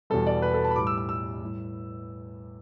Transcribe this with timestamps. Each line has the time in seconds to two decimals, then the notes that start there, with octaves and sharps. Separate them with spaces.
0.10 E2 B2 G3 A4
0.27 D5
0.42 B4
0.54 A4
0.65 A5
0.71 B5
0.75 A2 G3 D6
0.87 E6
0.98 E6
1.09 E6
1.41 A2 G3